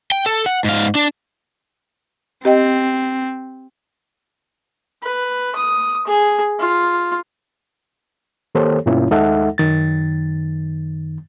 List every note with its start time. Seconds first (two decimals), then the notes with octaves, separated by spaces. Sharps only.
0.12 G5
0.26 A4
0.46 F#5
0.64 G#2 F5
0.95 D4
2.45 C4 G4 D#5 G5
5.03 B4
5.55 D#6
6.07 G#4
6.60 F4
8.55 D#3 A#3 G4 A4 C5 C#5
8.86 G2 B2 A#3 C#4 E4 F4
9.11 D#2 G#3 D#4 A4 E5 F#5
9.58 F#2 D#3 A6